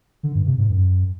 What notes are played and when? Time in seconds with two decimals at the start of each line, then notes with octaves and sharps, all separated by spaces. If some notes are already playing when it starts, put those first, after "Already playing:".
0.23 D3
0.35 G2
0.46 C3
0.58 G#2
0.69 F#2